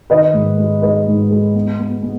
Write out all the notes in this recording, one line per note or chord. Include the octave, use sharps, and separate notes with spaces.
D#3 B4 D#5
G#2
G#3
G#3 B4 D#5
G#2
G#3
B3
B3
B3